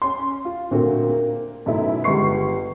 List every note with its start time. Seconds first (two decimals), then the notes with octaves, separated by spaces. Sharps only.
0.02 C#4 C6
0.45 F4
0.71 A#2 D3 A3 A#3 C4 F#4
1.09 A#3
1.66 F#2 B2 A3 D#4 E4
2.04 G1 G3 G#3 C#6 C7